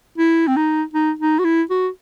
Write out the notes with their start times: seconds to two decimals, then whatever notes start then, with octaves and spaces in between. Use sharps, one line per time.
0.18 E4
0.48 C4
0.56 D#4
0.94 D#4
1.19 D#4
1.39 F#4
1.45 E4
1.70 F#4